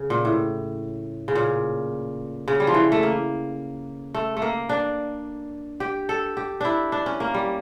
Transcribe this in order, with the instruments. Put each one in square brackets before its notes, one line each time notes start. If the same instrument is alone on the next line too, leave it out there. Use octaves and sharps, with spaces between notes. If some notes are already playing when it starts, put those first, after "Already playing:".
Already playing: [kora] C#3
A#2
A2
C#3
A#2
C#3
G3
F3
E3
A3
A#3
A3
A3
A#3
D4
G4
A4
G4
D4 E4
D4
C#4
A#3
G3